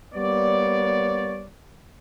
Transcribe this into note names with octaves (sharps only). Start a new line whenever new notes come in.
G3 A#3 B3 C#5 D5